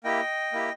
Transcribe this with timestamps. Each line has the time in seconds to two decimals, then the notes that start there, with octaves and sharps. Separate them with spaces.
0.04 A#3 E4 G4 D#5 G5
0.52 A#3 E4 G4